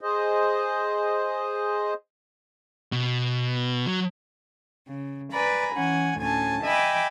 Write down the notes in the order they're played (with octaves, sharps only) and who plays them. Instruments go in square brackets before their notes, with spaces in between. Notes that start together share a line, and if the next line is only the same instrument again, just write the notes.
[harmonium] G#4 C5 D#5
[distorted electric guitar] B2
F#3
[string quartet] C#3
B4 D5 G#5 A#5 B5
E3 C#4 F#5 G#5
D2 A2 C#4 G#5 A5
D#5 E5 G5 G#5 B5 D6